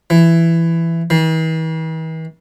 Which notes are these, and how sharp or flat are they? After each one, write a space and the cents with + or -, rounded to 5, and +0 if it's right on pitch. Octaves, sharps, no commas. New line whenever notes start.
E3 +15
E3 -45